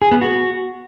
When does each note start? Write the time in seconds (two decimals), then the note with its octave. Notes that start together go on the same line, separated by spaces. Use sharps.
0.02 G#4
0.12 B3
0.21 F#4